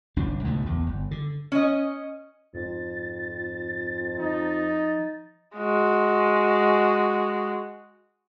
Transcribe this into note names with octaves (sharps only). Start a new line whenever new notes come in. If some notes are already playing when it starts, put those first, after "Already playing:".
G1 C2 D4
C#2 G#2 B2 A3
A#1 E2
G1
D3
C#4 D#5
F2 G#2 A6
F3 D#4
G#3 F#4